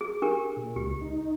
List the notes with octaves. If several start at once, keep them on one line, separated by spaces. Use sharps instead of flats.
G#4
D4 G4 A#4
A#2
C#2 G4
D#4